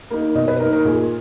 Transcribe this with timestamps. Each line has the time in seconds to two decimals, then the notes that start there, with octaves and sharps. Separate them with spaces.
0.11 A#3 D#4
0.35 B2 D#5
0.48 B4
0.60 A#3 D#4 A#4
0.73 A#4
0.85 A#2 G#4